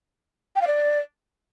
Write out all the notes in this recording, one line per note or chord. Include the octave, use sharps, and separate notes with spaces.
G5
F5
D5